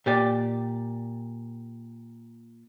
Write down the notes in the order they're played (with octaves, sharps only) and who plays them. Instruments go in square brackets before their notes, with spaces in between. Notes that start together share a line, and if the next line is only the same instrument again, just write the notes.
[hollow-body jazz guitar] A#2 G4 D5